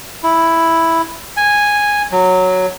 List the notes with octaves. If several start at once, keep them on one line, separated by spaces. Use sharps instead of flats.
E4
G#5
F#3